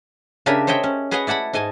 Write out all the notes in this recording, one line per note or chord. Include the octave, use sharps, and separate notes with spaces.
C#3 D4 G4 A#4 E5 G#5
C5 C#5 D#5 E5 G5
C#4
G#4 B4 C#5 D#5 F#5 G#5
E4 D5 F#5 A5 B5
G#2 D#5 G#5 A5